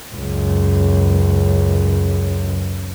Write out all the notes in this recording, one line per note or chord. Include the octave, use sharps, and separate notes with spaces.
C#2 F#2